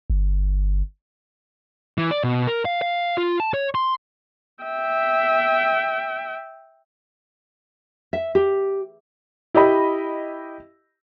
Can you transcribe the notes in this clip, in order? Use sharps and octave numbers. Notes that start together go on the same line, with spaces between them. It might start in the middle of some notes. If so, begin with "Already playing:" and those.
G1
E3
D5
B2
A#4
F5
F5
F4
A5
C#5
C6
E5 G5
E5
G4
E4 G4 D#5 B5